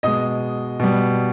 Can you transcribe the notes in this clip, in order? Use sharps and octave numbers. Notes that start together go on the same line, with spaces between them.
B2 G#3 D#5 D#6
B2 G3